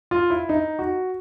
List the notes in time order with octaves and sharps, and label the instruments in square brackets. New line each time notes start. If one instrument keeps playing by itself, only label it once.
[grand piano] F4
E4
D#4
F#4